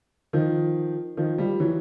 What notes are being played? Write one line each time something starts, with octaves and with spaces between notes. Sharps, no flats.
D#3 F3
D#3 F3
F3 G3
E3 F#3